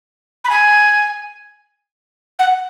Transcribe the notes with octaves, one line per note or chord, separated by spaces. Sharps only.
B5
G#5
F#5